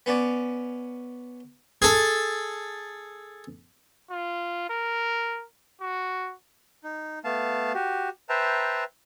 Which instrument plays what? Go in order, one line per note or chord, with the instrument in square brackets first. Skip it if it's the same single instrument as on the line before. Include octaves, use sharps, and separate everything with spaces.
[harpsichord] B3 C#4 D5
G#4 A4
[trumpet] F4
A#4
F#4
[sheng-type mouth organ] D#4
A3 B3 F5 A5
F#4 G4
B4 C5 E5 G5 A5 A#5